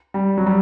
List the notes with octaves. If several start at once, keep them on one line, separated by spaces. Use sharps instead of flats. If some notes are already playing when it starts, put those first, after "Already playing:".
G3
F#3
G3